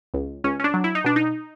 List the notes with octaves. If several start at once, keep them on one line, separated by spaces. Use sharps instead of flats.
C#2
C#2 C#4
C#4
D4
F#3
E4
D#4
B2 D4
D#4